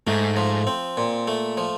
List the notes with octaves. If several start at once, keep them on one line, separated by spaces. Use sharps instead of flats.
G#2 A3
F3
C4
A#2
A3
F3